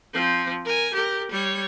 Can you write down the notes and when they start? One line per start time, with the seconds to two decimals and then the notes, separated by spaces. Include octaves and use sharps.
0.13 F3 C4
0.65 A#4 G#5
0.94 G4 A#4
1.31 G3 C#5